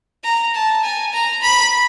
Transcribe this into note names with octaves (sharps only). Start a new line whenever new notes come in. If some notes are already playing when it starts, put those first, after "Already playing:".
A#5
A5
G#5
A#5
B5